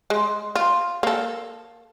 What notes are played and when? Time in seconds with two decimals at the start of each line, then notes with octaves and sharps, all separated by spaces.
0.10 G#3
0.56 F4
1.03 A#3 A4